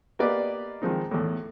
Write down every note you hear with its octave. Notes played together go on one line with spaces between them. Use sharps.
A#3 B3 G4 B4 D5 D#5
D#3 F3 G#3 C4 D#4
E2 A2